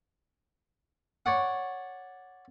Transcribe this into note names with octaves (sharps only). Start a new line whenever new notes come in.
C#5 D5 F#5